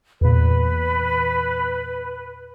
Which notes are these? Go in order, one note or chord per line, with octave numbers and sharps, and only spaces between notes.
E2 A#2 B4